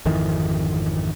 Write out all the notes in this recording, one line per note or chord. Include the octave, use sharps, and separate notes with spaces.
G#1 F2 D#3 E3